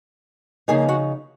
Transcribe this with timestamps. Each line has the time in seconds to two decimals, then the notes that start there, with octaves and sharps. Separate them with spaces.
0.68 C#3 F3 A#3 D#4 G#4 G#5
0.88 F#4 F#5